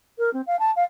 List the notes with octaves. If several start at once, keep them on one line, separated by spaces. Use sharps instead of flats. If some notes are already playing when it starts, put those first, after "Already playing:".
A#4
C4
F5
A5
F5